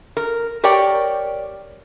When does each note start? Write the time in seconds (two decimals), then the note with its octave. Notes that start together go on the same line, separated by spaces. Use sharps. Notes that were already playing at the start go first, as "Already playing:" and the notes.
0.17 A#4
0.64 G4 A#4 C#5 D5 G5